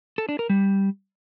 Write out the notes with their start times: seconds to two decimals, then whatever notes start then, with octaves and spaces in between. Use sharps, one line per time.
0.18 A4
0.29 D4
0.39 A#4
0.50 G3